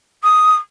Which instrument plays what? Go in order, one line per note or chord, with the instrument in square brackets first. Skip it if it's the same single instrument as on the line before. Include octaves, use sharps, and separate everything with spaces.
[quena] D#6